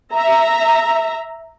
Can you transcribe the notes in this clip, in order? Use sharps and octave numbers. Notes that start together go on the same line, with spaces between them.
E5 A#5